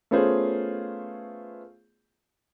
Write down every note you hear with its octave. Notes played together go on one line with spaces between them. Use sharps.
A3 B3 C#4 F4 G#4 C5